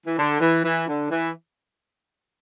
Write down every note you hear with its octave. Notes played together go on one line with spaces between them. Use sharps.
E3
D3
E3
E3
D3
E3